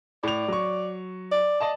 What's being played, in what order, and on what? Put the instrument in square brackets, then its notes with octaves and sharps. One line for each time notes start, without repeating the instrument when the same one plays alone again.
[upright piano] A2 F7 [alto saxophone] D5
[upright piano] F#3 C#6
[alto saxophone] D5
[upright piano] D5 D#5 A5